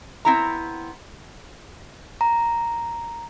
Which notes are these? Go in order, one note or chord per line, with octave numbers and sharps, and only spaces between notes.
B3 C4 E4 A#5
A#5